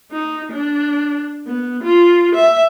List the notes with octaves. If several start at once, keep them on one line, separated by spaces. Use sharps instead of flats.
D#4
D4
B3
F4
E5